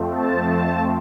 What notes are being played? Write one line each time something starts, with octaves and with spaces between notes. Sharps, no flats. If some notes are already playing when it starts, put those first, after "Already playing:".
Already playing: F2 F3 A3 C4
A5
A5